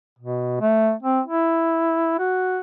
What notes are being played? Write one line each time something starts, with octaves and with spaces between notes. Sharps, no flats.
B2
A3
C4
E4
F#4